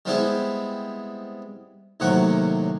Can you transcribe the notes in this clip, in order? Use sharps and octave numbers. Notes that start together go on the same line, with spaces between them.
G3 G#3 B3 C4 E4 G#4
D#2 A2 C3 F#3 F#5 C#6